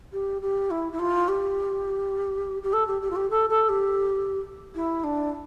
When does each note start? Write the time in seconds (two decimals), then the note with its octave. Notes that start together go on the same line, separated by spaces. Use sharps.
0.13 G4
0.42 G4
0.70 E4
0.92 E4
0.99 F4
1.28 G4
2.63 G4
2.73 A4
2.87 G4
3.02 G4
3.10 F4
3.16 G4
3.30 A4
3.49 A4
3.69 G4
4.75 E4
5.04 D4